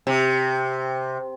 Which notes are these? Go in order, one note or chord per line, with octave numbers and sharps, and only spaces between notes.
C3